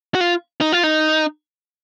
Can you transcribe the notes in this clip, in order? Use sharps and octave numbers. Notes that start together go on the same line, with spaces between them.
F#4
F4
D#4
F4
D#4